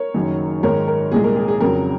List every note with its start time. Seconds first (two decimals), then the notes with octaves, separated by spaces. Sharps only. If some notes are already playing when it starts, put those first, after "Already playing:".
Already playing: A#4 C#5
0.14 F#1 F#2 D#3 F#3
0.63 G#1 G#2 D#3 G#3 A#4 C#5
0.87 A#4
1.12 C2 A#2 G#3 G#4
1.24 A#4
1.36 G#4
1.48 G#4
1.60 F2 C#3 F#3 A#4